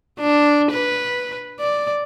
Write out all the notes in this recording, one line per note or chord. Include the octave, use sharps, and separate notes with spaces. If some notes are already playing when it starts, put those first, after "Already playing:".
D4
B4
D5